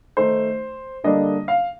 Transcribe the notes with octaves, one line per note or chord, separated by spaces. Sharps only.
D#3 A3 D#4 C5
D3 G3 A#3 D4 D#5
F5